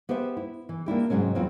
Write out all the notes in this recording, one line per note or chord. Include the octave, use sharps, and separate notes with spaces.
B3 G4 B4 C5 E5
E4
E3
A#3 D4 E4 G4
G#2 C3 F#3 G#3 C#4
E2 F#3 C4 F4